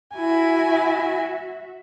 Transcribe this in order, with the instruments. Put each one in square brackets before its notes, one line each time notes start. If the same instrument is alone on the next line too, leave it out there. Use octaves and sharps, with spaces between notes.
[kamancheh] E4 G#5 [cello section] F#4 E5